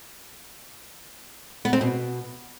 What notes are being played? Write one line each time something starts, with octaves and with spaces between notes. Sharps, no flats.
B3
C4
B2